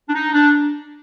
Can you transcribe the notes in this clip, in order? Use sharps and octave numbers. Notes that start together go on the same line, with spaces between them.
D4
D#4
D4